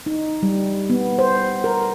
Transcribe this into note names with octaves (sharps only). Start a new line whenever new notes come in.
D#4
G3
B3
C5
A#4